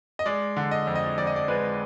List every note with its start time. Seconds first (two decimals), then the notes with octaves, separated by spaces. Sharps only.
0.19 D#5
0.26 G#3 D5
0.57 D3
0.71 D#5
0.87 F2
0.95 D#5
1.17 F2 D5
1.27 D#5
1.36 D5
1.48 G#3 B4